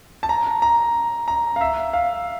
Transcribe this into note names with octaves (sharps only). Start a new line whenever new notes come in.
A5
A#5
A#5
A#5
F5
E5
F5